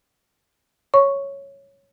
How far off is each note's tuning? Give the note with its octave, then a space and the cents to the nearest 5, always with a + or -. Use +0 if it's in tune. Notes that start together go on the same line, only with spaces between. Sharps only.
C#5 +0 C#6 +0